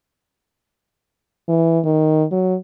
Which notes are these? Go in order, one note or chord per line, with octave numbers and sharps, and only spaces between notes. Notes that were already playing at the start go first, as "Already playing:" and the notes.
E3
D#3
F#3